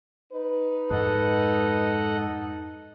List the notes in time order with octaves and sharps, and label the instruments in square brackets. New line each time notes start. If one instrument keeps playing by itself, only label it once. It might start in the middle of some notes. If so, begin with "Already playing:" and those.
[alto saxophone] D#4 [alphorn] B4
[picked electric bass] F2 G#2 G#3 [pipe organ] A4 D#5 F#5